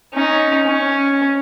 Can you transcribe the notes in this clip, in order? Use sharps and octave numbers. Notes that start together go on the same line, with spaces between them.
C#4 D#4
C#4